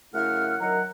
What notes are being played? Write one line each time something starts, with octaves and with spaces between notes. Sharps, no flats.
F#2 C#3 A3 E4 F#5 F6
F#2 D#3 F#3 D#5 F#5 A#5